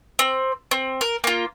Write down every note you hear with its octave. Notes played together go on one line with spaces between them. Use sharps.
C4
C4
A#4
A#3 F4